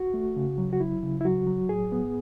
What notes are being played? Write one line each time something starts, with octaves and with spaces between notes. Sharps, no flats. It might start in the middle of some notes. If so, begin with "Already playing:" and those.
Already playing: F#4
A3
C#3
F#3
F#4
F#3 E4
C#3
E4
F#3 F#4
F#3
A2 G#4
B3